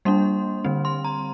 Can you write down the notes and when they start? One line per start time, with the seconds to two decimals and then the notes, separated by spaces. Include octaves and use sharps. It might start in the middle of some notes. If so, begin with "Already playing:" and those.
0.05 G3 A#3 D4 C6
0.64 D3 G3 C4
0.85 C6
1.05 A#5